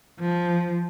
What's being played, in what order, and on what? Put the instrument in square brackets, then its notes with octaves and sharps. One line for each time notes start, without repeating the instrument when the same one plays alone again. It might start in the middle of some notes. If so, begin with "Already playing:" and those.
[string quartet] F3